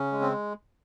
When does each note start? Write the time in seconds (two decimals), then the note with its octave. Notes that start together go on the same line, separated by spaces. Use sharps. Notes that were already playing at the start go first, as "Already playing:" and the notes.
Already playing: C#3 C#4
0.12 G#3
0.21 C4